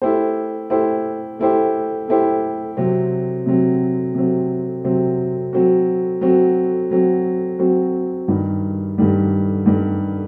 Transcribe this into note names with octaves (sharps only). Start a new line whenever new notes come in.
A3 E4 G4 C5
A3 E4 G4 C5
A3 E4 G4 C5
A3 E4 G4 C5
C3 F#3 C4
C3 F#3 C4
C3 F#3 C4
C3 F#3 C4
F#3 C4 F#4
F#3 C4 F#4
F#3 C4 F#4
F#3 C4 F#4
G2 D#3 G3
G2 D#3 G3
G2 D#3 G3